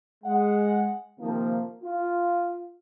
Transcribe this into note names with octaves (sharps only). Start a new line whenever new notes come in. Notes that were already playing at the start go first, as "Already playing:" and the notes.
G#3 F#5
C3 D#3 F3 A#3
F4